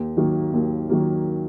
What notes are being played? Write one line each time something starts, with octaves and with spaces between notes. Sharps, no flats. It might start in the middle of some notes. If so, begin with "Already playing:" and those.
Already playing: D#2
D#3 F#3 A#3
D#2
D#3 F#3 A#3